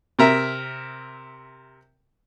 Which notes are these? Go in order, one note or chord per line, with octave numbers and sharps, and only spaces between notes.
C3 A#4 E5